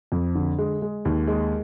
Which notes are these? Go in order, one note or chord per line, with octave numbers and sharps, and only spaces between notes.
F2
D3
G#3
G#3
D#2
G#3